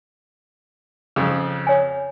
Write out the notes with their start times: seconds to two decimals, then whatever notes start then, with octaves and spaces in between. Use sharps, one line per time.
1.16 F2 C#3
1.67 C#5 G#5